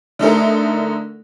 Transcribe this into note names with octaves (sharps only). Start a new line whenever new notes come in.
D3 A3 D#4 E4 A4 A#4